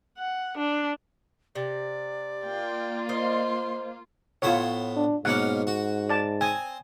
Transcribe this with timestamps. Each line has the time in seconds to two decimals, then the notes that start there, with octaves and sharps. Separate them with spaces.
0.18 F#5
0.58 D4
1.55 C3 D5
2.45 A#3 F4 G5
3.09 C5 D#5 C6
4.42 A2 B3 F4 C5 C#5
4.96 D4
5.25 G#2 B2 A#3 C#4 F#5
5.67 F#4
6.09 D5 A5
6.41 C4 G#5